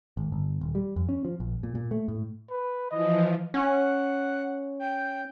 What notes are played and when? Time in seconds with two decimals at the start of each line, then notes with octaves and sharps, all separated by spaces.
0.17 G#1
0.32 G1
0.61 D#1
0.75 G3
0.96 F2
1.09 C#4
1.25 F3
1.40 A#1
1.63 A#2
1.75 A#2
1.91 A3
2.08 A2
2.50 B4
2.91 E3 F3 D#5
3.54 C#4 F#5
4.79 G5